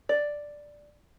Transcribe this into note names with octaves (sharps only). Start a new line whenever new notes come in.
D5